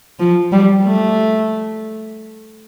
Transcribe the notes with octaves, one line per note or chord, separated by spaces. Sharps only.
F3
G3
A3